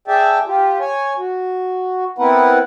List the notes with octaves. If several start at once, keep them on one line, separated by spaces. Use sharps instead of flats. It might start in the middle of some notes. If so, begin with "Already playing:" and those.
G#4 D5 E5 G5 A5
F4 G4
C#5 G#5
F#4
B3 C4 E4 A#4 B4 F#5